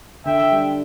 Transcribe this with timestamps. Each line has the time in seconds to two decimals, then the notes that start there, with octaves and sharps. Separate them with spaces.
0.25 D3 E5 G5
0.52 G3 D4